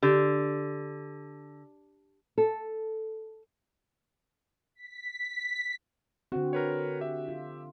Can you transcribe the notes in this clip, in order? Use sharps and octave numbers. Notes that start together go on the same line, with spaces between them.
D3 G4
A4
B6
D3 C4 F#4
A#4 B4 C#5
G4 E5
F4